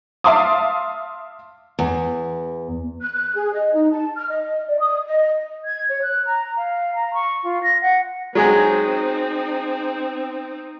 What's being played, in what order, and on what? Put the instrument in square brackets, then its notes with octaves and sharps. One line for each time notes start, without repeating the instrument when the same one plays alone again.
[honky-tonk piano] E5 F5 A5 C6 D6 D#6
[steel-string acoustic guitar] E2
[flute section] F#6
F#6
G#4
D#5
D#4
A5
F6
D#5
D5
D#6
D#5
[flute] G#6
C#5
F#6
A#5
F5
A#5
C#6
F4
A#6
F#5
[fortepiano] F#3 G#3 G#4 [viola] C4 D#4